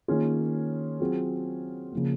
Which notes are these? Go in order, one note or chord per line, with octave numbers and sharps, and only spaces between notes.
D#3 A#3 C#4 F4 G#4
F#3 C4 F4 G#4
C#3 F3 A#3